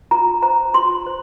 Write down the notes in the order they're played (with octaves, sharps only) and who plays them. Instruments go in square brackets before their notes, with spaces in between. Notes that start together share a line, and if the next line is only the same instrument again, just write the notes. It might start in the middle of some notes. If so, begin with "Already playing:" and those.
[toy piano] F4 A#5
C5 A#5
F4 C6
C5